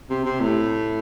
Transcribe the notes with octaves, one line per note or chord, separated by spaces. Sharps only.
C3
C3
A2